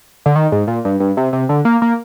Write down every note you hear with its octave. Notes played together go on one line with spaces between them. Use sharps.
D3
D#3
G#2
A#2
G2
G2
C3
C3
D3
A#3
A#3